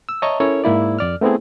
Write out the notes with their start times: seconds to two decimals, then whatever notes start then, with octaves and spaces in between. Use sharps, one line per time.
0.09 E6
0.22 C#5 D#5 E5 A5 A#5 C#6
0.40 C#4 E4 A4 A#4 C#5
0.64 G#2 A#3 E4 D5
0.99 F2 D5 F6
1.21 A3 B3 C4 E4 G#4